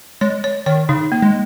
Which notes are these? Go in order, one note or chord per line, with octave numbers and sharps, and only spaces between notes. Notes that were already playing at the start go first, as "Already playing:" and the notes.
G#3 C#5
C#5
D#3 C#5
C#3 D#4
A#3
G#3